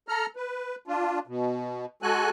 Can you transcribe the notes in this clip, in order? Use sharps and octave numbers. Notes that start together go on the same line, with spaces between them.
A4 A#5 F6
B4
D4 F4
B2
G#3 F#4 A4 G#5 F#6